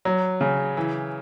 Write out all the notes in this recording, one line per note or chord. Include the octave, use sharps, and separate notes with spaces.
F#3
C#3
E3